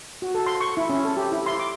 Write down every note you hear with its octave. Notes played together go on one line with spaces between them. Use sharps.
F#4
A4
C6
C#6
E4
C#4
A4
G4
E4
C6
D6